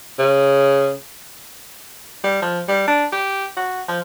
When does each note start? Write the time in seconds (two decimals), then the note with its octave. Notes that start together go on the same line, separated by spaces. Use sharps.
0.19 C#3
2.24 G3
2.42 F3
2.68 G3
2.88 D4
3.12 G4
3.57 F#4
3.88 F3